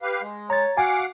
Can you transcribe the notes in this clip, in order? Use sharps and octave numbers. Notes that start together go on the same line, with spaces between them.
G4 B4 F5
G#3
C#5 A#5 A6
F#4 F5 F#5 G#5 D6